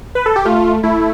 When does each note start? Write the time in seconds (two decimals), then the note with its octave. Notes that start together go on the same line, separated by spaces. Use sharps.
0.15 B4
0.26 A4
0.36 G4
0.45 A3 F4
0.83 A3 E4